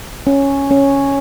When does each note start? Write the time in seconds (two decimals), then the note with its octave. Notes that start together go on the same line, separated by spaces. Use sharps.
0.27 C#4
0.71 C#4